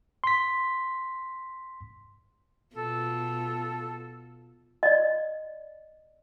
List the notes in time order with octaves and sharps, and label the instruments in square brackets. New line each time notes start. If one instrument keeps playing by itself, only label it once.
[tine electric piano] C6 B6
[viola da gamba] B2 F4 [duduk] A4
[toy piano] D5 D#5